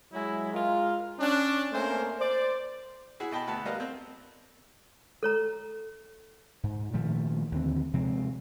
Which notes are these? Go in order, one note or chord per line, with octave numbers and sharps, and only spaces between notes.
F#3 G#3 E4
G#3 F4 A#4
C#4 D4
A3 A#3 C4 C#4 A#4 C5
C5 D5
E4 F#4 G#4
B2 D#5 G5 A5 B5
D2 B3 F#4 A5
G3 A#4 B4 D#5 F5
C4
A4 C#5 A#5
G#2
A#2 D#3 F3 A3
D#2 D3 C4
C3 F3 G#3 C4